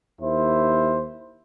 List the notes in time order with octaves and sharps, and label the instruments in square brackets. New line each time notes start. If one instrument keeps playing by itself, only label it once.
[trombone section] D#2 E4 C5